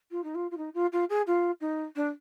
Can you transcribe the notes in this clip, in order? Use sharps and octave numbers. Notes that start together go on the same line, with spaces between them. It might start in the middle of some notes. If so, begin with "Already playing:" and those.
F4
D#4
F4
F4
D#4
F4
F4
G#4
F4
D#4
D4